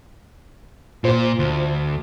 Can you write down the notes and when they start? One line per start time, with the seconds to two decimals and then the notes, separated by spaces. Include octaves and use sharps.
1.04 A#2 F4 C5
1.39 D2